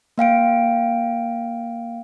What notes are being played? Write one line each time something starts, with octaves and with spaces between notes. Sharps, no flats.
A#3 F5 G5 D7